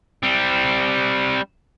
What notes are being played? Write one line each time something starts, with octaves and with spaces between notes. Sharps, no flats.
G3 C4